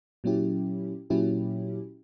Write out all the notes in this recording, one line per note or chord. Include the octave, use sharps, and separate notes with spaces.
A#2 F#3 C#4 E4 G4
A#2 F#3 C#4 E4 G4